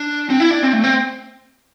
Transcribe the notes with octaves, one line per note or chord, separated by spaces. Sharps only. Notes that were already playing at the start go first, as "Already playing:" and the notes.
Already playing: D4
C4
E4
D4
C4
A3
C4